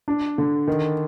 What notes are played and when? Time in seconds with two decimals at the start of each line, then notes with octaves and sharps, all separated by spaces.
0.08 D4
0.38 D3
0.68 D#3